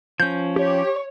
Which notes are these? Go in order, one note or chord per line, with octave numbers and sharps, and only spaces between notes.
F3 C#4 G6
G4 C#5